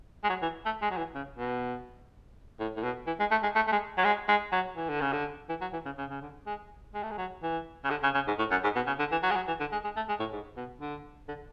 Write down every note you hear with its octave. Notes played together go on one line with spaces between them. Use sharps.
G#3
F#3
E3
A3
G#3
F#3
E3
C#3
B2
A2
A2
B2
E3
G#3
A3
G#3
A3
A3
G#3
F#3
G#3
G#3
F#3
E3
D3
C#3
D3
E3
F#3
E3
C#3
C#3
C#3
D3
G#3
G#3
A3
G#3
F#3
E3
C#3
D3
C#3
C#3
G#2
A2
F#2
G#2
B2
C#3
D3
E3
F#3
G#3
F#3
E3
D3
G#3
G#3
A3
G#3
A2
G#2
B2
D3
D3